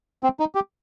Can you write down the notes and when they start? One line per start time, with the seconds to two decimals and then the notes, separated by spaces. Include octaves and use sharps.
0.23 C4
0.40 D#4
0.55 G4